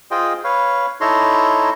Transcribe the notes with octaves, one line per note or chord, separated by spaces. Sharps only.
F4 G#4 C5 D#5 G5
B4 C#5 F5
D#4 E4 A4 C#5 A#5 C6